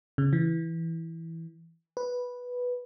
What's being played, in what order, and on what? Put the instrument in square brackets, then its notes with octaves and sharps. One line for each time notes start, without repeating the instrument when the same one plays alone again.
[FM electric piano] C#3
E3
B4